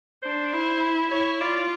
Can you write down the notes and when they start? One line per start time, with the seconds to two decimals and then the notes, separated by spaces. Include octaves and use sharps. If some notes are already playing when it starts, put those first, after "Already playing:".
0.23 D4 C5
0.53 E4
1.11 E4 C#5
1.40 F4 D5